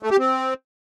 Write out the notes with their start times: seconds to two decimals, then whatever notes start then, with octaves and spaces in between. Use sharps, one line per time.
0.03 A3
0.11 G4
0.19 C4